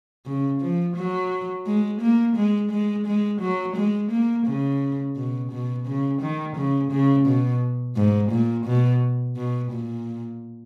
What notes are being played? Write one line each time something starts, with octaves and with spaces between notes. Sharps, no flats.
C#3
F3
F#3
G#3
A#3
G#3
G#3
G#3
F#3
G#3
A#3
C#3
B2
B2
C#3
D#3
C#3
C#3
B2
G#2
A#2
B2
B2
A#2